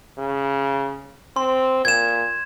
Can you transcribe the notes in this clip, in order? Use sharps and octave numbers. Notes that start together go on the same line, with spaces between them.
C#3
C4 C6
A#2 G#6 E7